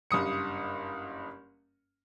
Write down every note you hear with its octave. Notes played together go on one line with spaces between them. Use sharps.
F#1 G2 D#6 C#7